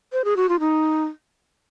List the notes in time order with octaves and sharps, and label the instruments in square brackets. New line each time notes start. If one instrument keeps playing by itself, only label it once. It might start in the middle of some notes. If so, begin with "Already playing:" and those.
[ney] C5
G#4
F#4
F4
D#4